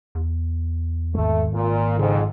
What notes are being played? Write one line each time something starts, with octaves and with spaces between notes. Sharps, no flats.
E2
G#1 G#3 A3
A#2
F2 G#2 C#3